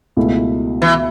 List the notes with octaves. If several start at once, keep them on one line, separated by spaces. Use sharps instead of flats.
C#2 B2 A3 E4
E3